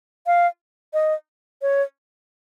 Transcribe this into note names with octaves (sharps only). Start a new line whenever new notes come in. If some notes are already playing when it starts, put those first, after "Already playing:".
F5
D#5
C#5